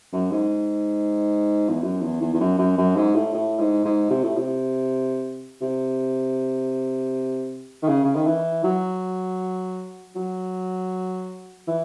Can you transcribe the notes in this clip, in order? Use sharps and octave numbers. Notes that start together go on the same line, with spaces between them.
F#2
G#2
E2
F#2
E2
E2
E2
F#2
F#2
F#2
G#2
A2
A2
G#2
G#2
C3
A2
C3
C3
D#3
C#3
C#3
D#3
E3
F#3
F#3
E3